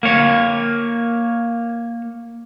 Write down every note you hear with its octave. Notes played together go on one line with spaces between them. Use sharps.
A#3 C#5